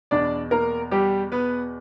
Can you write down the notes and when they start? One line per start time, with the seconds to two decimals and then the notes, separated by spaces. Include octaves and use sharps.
0.11 E2 B2 D4 D5
0.51 A#3 A#4
0.91 G3 G4
1.32 B3 B4